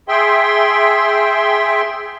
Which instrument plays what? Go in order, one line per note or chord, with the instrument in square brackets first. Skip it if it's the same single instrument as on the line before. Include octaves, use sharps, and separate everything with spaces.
[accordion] G#4 E5 G5 C6